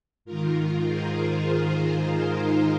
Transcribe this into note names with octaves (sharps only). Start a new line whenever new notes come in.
G#2 D#3 F4 A#4
G#4 C5
G#4 C5
F4 A#4
D#4 G#4